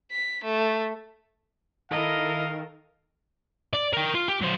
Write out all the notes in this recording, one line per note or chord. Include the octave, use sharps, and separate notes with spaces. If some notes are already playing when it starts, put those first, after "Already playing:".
B6
A3
D#3 E4 A4 A#4 D#5 F5
D5
A#4 G5
F4
G4
F#3 C5